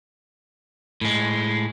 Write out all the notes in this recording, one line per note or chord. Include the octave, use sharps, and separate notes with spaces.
A2 G#3